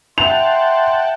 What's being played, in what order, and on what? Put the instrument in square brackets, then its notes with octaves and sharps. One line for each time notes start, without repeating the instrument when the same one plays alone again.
[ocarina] E5 [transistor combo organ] F#5 G5 A5 [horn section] C6 [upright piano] F7